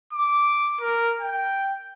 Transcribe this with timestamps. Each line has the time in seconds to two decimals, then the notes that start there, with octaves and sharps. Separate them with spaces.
0.13 D6
0.81 A#4
1.21 G5